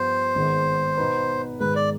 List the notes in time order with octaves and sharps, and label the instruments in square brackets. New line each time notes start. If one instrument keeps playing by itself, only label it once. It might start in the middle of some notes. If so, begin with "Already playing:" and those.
Already playing: [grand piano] G2 F3 B3 F4 [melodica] C5
[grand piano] G#1 G#2 D#3 G#3 B3
B2 B3 D#4 B4
[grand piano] G#2 D#3 G#3 [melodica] B4
[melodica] D5